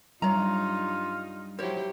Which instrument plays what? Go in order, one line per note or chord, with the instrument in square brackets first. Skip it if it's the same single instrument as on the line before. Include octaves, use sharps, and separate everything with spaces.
[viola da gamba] G2 D#4 [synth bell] F#3 G3 [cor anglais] F4 [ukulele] C#5 A#5
[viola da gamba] F#3 E4 G4 [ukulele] C5 C#5